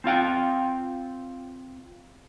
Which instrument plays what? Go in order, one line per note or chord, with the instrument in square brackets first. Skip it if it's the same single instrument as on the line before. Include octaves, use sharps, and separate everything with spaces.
[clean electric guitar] C4 F4 F5 G5